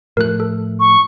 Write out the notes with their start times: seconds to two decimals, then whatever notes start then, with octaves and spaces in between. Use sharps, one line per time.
0.17 A2 F3 A3 A#4 F#6
0.40 A4
0.80 C#6